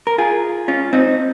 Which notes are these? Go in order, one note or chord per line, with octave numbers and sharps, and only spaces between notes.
A#4
F4 G#4
C#4 F4
C4 D#4